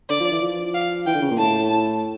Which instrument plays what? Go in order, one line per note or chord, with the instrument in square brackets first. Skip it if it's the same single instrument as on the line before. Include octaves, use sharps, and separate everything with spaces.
[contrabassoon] D3 [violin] D5
[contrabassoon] F3
E3
F3
[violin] F5
[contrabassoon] E3 [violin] G5
[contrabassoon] D3
C#3
A#2
[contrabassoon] A2 [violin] A5